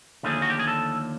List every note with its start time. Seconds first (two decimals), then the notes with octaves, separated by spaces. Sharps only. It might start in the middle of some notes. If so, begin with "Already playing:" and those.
0.23 D#2 D3 F3 A3 G#4
0.42 F#4
0.50 G4
0.59 G#4
0.67 A4